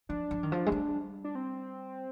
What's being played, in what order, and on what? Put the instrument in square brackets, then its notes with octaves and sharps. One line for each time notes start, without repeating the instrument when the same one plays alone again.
[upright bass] F3 [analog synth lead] D4
[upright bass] F3
D#3
F3
G#3
G3
[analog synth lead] D4
C4